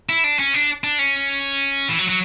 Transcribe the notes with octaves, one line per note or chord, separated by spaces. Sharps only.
E4
D4
C#4
D4
D4
C#4
E3
F#3
F#3